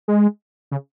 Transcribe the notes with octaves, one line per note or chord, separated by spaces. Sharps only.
G#3
C#3